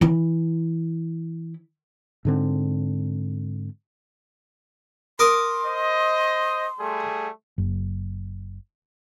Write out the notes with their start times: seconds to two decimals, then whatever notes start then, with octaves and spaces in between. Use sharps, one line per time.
0.01 E3 E4
2.25 G#2 D3 C4
5.19 A#4 C6 D6 D#6
5.66 C5 D#5
6.80 G3 A3 G#4
7.58 F#1